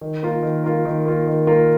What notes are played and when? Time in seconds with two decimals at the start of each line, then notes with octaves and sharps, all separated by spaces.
0.01 D#3
0.22 A#3 F4 A#4
0.43 D#3
0.64 A#3 F4 A#4
0.85 D#3
1.06 A#3 F4 A#4
1.27 D#3
1.47 A#3 F4 A#4